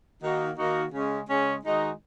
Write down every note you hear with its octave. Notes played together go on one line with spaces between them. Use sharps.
D#3 A#3 D#4 F#4
D#3 A#3 D#4 F#4
C#3 G#3 C#4
C#3 G#3 C#4
D#3 G#3 D#4 F#4